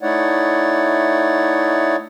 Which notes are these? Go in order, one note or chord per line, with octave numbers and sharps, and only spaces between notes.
A3 D#4 E4 C#5 D5 F#5